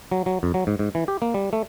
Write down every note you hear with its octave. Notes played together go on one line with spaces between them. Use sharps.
F#3
F#3
F2
F#3
G#2
G#2
E3
G4
A#3
G3
A3